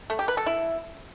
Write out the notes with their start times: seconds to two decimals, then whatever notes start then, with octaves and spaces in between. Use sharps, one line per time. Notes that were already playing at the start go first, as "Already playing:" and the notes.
0.10 A3
0.19 G4
0.28 B4
0.37 A4
0.46 E4